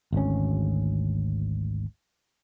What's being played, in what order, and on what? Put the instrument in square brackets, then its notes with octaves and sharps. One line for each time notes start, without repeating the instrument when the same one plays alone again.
[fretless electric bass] G#1 D2 C#4